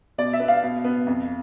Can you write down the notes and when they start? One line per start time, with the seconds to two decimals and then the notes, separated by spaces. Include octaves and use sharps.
0.18 B2 D5
0.33 E5
0.40 B3
0.48 F5
0.63 B2
0.84 B3
1.07 F2